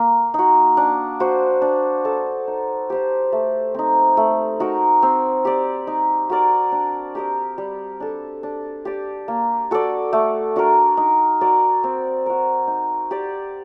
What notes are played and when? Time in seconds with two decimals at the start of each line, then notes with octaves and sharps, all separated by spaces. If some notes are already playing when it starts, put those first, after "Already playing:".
Already playing: A#3
0.34 D#4 F#4
0.77 D4
1.20 F#4 C5
1.62 D4
2.05 A4 D#5
2.47 D#4
2.90 G4 C5 D#5
3.32 A3
3.74 C4 D#4
4.17 A3
4.60 D#4 F#4 A#4
5.02 C4
5.45 G4 D5
5.87 D#4
6.30 F#4 A#4 D5
6.72 D4
7.15 G4 A#4 D#5
7.58 G3
8.00 D4 A4
8.43 D4
8.85 G4 D5
9.28 A#3
9.71 F#4 A4 D5
10.13 A3
10.56 D4 F#4 A#4
10.97 D#4
11.41 F#4 A#4 D5
11.84 C4
12.26 F#4 A#4
12.67 D#4
13.11 G4 D5